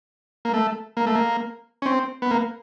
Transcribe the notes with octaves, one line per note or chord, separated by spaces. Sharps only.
A#3
A3
A#3
A3
A#3
C#4
C4
B3
A#3